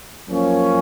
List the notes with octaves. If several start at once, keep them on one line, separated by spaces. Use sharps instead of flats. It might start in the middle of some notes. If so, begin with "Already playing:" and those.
F#2 F3 A#3 C#4